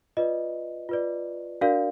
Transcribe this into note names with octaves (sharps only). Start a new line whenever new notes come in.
F4 B4 D5 D#5
F4 B4 D5
D4 F#4 A#4 D5 F5